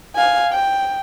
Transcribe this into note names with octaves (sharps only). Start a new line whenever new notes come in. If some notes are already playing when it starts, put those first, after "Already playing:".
F5 G#5
G5